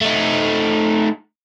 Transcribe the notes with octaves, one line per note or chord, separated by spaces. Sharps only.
A3 D#4